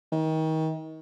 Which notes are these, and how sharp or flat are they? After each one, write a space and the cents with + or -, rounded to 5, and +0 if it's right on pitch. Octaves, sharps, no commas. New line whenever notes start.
D#3 +30